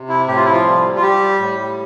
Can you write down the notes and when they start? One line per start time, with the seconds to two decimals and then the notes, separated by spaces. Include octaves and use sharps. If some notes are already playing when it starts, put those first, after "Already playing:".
Already playing: C3
0.09 E4
0.27 A2 G4
0.36 F4
0.44 E4
0.52 F3 F4
0.65 G3
0.96 F4
1.02 G3 G4
1.40 A2